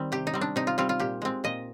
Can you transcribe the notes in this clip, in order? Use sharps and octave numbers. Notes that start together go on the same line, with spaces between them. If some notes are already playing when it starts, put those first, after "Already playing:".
Already playing: D#3 G3 C4
C3 G4
D#4
G3 C4
D4
C3 D#4
F4
G3 C4 F4
F4
A#2 G4
G#3 C4
A#2 D#5